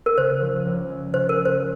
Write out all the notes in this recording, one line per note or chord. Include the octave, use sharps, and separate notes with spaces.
A#4
C#3 C5
F3
C#2
G#3
C#3 C5
A#4
F3
C5